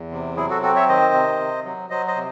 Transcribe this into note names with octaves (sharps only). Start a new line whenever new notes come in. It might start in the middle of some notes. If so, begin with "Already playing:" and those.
Already playing: E2
C3
F#3 E4 G#4
F#4 A4
C4 F#4 A4
C#5 E5
D#3 C5 D#5
C3
C3
F#3
F#3 C5 D#5
C5 D#5
C3